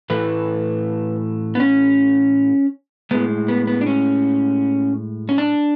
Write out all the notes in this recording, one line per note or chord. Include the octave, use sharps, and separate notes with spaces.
A2 E3 A3 B4
B3
C#4
A2 G#3 B3
B3
B3
D4
C#4
C#4
D4